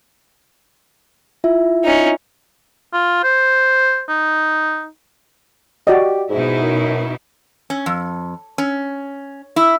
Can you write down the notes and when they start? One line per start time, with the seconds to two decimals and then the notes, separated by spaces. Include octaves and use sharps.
1.44 E4 F4 E5
1.84 C#4 D#4
2.93 F4
3.24 C5
4.09 D#4
5.87 F#4 G4 D5 D#5
6.30 G#2 B2 D#4 E4
6.63 F#2
7.70 C#4
7.86 F2
8.58 C#4
9.56 E4